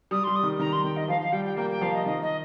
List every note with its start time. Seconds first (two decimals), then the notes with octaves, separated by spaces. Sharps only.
0.11 G3 D#6
0.23 G3 C6
0.35 D#6
0.43 D#3
0.59 D#3 A#5
0.72 C6
0.84 D#3 G5
0.96 D#5
1.08 F3 F5
1.21 F5
1.32 G3 G5
1.45 G5
1.57 A#3 G5
1.69 G5
1.81 F3 F5
1.93 D#5
2.05 D#3 D#5
2.22 D#5